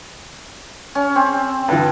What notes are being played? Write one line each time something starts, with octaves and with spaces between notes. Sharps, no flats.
C#4
C4
G2 D3 E3